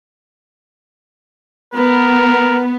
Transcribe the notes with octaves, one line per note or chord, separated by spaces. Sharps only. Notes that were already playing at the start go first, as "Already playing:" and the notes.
B3 A#4